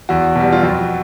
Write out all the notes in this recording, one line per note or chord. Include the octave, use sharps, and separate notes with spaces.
E2 F#4
B2 G3
F4
F2 F#4